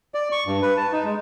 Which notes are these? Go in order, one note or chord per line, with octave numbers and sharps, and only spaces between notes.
D5
C#6
G2
B4
A5
D#4
G#3